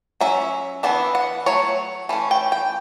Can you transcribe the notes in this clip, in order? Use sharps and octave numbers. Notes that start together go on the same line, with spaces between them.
F#3 C#4 E5
E3 B3 D4 E5
F#5
F#3 A3 C#5
E3 A3 C#4
G5
G5